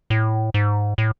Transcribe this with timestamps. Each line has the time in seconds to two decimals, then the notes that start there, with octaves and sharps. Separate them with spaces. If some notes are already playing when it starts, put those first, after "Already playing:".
0.10 A2
0.54 G#2
0.98 A2